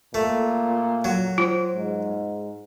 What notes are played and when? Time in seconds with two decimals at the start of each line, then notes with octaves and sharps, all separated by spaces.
0.14 A#2 A3
1.05 F#3
1.38 F4 C5
1.75 G#2